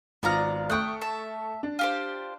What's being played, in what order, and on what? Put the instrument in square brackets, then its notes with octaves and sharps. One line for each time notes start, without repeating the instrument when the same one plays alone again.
[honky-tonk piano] G#1 F4 F6 [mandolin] B3 D5 A#5
[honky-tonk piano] A3 C#6 [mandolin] G5 D#6 F#6
[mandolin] E5 A5
[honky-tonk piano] D4
[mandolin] F4 G4 C5